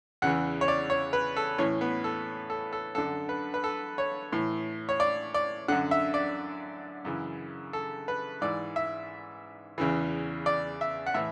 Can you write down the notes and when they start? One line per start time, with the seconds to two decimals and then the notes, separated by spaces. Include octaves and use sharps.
0.22 E2 C#3 E3 F#5
0.61 C#5
0.68 D5
0.90 C#5
1.13 B4
1.36 A4
1.58 A2 E3 C#4
1.81 B3
2.04 A4
2.50 A4
2.73 A4
2.95 F#2 D3 A4
3.29 B4
3.54 B4
3.64 A4
3.98 C#5
4.32 A2 E3
4.89 C#5
5.00 D5
5.34 D5
5.68 F#2 D3 F#5
5.91 E5
6.14 D5
7.05 F#2 C#3 E3
7.73 A4
8.08 B4
8.41 G#2 E3 D5
8.76 E5
9.78 E2 C#3 E3
10.46 D5
10.81 E5
11.06 F#5
11.14 A2 E3 E5